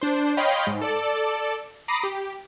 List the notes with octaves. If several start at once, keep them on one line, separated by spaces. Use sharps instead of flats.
D4 C5
C#5 D#5 F5 G5 B5 C6
G#2
A4 D5
A#5 B5 D6 D#6 A#6 C7
G4